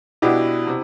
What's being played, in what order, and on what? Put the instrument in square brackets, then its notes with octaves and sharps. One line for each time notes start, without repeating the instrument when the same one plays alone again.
[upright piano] B2 B3 D4 G4 [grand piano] E4
[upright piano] C3